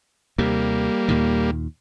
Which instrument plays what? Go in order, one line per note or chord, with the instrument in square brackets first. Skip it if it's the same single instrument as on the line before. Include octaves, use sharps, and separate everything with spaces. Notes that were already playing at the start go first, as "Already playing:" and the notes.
[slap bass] D#2 C3 [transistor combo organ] G3 A#3
[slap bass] D#2 A#2 D#3